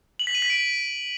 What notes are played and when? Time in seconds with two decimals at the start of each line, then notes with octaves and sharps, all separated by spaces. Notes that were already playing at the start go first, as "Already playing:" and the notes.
0.19 F#7
0.27 B6
0.35 D#7
0.42 B6
0.50 D7